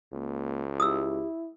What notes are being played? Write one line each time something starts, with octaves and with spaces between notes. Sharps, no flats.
C#2 A#3
E4 G4 D#6 E6